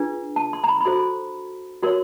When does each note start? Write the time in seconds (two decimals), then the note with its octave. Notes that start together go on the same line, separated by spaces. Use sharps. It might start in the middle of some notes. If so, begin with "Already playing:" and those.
Already playing: D4 F4 G#4 B4
0.36 A5
0.53 C6
0.64 A#5
0.69 B5
0.81 B5
0.85 F#4 A4 C5 C6
1.83 F#4 A#4 C#5 C6